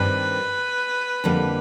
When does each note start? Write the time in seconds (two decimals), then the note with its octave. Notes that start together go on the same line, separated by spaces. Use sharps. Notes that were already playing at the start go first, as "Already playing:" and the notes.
Already playing: G2 D#3 G3 C4 B4
1.24 F2 D3 G3 A#3